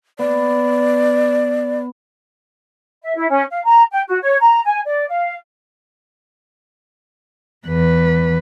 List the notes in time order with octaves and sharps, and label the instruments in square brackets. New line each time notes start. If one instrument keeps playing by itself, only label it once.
[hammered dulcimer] B3 [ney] D5
[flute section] E5
E4
C#4
F5
A#5
G5
F#4
C#5
A#5
G#5
D5
F5
[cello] E2 B4